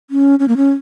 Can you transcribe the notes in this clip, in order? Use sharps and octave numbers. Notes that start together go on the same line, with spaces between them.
C#4
C#4
A#3
C#4